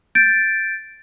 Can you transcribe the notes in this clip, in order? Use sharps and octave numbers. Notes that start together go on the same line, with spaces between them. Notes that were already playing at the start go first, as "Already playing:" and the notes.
G6 A6 D7